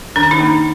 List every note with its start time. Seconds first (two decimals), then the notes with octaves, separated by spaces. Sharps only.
0.16 D#3 D4
0.31 D#4
0.40 A#3 D4